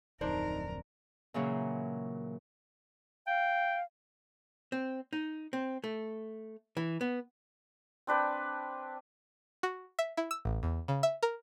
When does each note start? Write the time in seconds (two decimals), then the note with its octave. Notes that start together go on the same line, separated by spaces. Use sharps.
0.21 D1 F2 D4 D#4 A#4 C5 D5
1.34 A#2 C#3 E3 F#3 A#3
3.27 F5 G5
4.72 C4
5.13 D#4
5.53 C4
5.84 A3
6.77 E3
7.01 B3
8.07 C4 D4 B4 G5
9.63 F#4
9.99 E5
10.17 E4
10.31 E6
10.45 A1
10.63 E2
10.88 C#3
11.03 E5
11.23 A#4